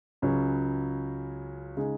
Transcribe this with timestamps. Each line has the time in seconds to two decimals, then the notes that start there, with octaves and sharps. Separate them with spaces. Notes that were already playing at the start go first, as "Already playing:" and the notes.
0.22 C#2 C#3 F#3 C#4
1.77 C#3 G#3 D#4 G#4